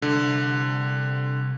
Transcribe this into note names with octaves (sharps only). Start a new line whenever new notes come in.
C2 D3